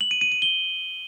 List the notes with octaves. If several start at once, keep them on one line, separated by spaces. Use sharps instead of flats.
F#7
D#7
D#7
D#7
G7